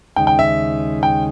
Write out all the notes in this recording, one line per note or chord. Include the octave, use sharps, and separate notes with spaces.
D#2 C#3 G#3 D#4 G5
G5
E5
G5